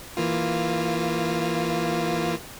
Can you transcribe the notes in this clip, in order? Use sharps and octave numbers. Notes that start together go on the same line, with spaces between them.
E3 A#3 F4